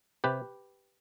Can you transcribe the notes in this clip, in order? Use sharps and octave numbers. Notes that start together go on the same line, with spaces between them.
C3 G4 B4